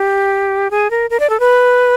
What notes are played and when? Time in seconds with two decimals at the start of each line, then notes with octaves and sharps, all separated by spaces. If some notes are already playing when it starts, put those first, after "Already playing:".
Already playing: G4
0.71 G#4
0.91 A#4
1.10 A#4
1.20 D5
1.30 A4
1.40 B4